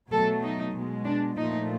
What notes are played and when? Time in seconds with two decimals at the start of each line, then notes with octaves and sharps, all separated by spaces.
0.11 B2 F#3 A3 A4
0.43 D#4
0.74 B2 G#3
1.05 D4
1.37 A#2 F3 A3 D#4